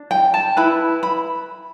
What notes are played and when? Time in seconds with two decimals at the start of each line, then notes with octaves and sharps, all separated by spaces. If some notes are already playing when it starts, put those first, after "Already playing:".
Already playing: D4
0.11 G5
0.34 A5
0.57 E4 B4 B5
1.03 B5